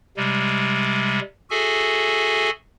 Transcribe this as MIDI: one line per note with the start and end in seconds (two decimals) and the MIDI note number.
0.17 1.20 48
0.17 1.20 55
0.17 1.20 56
1.50 2.50 66
1.50 2.50 68
1.50 2.50 69
1.50 2.50 76
1.50 2.50 80